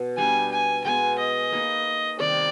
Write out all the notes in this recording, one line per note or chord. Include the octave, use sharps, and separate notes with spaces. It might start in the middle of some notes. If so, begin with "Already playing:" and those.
Already playing: B2
G3 B3 D4 G4 G#5
G#5
B2 G#3 B3 G#5
D#5
A#3 D#4 G#4 B4
C3 D#3 G3 D5